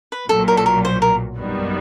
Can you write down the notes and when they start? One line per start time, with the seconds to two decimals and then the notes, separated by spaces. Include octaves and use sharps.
0.12 B4
0.29 B1 A#2 F#3 A4
0.48 A#4
0.57 A4
0.66 A#4
0.85 C5
1.02 A#4
1.38 G#1 F#2 D#3 G3 B3